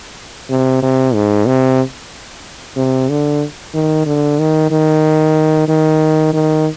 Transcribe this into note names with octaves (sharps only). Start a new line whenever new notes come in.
C3
C3
G#2
C3
C3
D3
D#3
D3
D#3
D#3
D#3
D#3